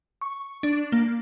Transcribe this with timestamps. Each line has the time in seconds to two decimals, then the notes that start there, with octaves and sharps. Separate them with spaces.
0.21 C#6
0.63 D4
0.92 A#3